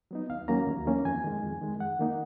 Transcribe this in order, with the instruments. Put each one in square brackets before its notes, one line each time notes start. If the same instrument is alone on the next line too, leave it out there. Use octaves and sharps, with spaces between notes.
[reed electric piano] F#3 B3 D#4
D#2 F5
D#3 F#3 A#3 C#4 A#5
D#2
D#3 F#3 A#3 C#4
F2 G#5
D#3 G#3
F2
D#3 G#3
F2 F#5
D#3 A#3 D#4